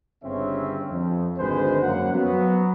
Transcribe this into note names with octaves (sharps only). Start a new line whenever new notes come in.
G1 G2 C#3 C4 C#4 E5
F2
G#1 D2 G#3 B4 C5
F#2 A#3 F#5
F#3 B3